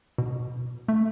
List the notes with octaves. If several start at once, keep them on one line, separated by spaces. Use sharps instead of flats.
B2
A3